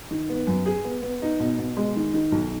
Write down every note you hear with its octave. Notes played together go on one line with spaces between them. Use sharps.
D#3
B3
F#2
G#4
B3
B3
D#4
B2
B2
G#3
D#3
D#3
B1